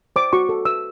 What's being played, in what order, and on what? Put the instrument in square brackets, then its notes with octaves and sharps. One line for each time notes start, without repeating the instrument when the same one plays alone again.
[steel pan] C5 D6
F#4 C#6
A4
B4 E6